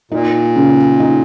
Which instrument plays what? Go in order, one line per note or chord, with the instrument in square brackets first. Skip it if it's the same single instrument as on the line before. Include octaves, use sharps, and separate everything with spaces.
[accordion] A#2 [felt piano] D#4
[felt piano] C#3
D#4